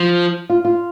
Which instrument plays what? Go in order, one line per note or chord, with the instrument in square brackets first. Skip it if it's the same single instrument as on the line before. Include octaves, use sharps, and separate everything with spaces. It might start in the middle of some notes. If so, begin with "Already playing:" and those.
Already playing: [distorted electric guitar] F3
[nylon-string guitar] F4
F4